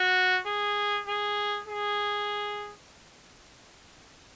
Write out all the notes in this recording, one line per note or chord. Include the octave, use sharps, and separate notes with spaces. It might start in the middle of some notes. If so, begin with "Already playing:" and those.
Already playing: F#4
G#4
G#4
G#4